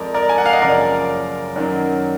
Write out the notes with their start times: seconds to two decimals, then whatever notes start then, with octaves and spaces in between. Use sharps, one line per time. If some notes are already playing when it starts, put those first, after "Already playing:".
Already playing: F2 F3 G#3 A#4 D5
0.14 A#4 D5
0.29 G#5
0.38 F#5
0.46 F5
0.53 D#5
0.61 F#1 F#2 F3 A#4 D5
1.56 F#2 D#3 F#3